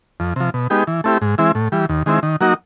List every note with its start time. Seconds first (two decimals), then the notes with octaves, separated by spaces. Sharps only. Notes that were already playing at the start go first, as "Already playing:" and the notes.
0.20 F2
0.36 C3 F3
0.54 B2
0.70 G#3 B3 D#4 G4
0.87 E3
1.04 A3 C4 E4 G4
1.22 G#2
1.38 E3 G#3 C4 E4
1.55 A2
1.72 E3 G3
1.89 D#2
2.06 D#3 G#3 C4 E4
2.23 D#3
2.41 F#3 A#3 D#4 F#4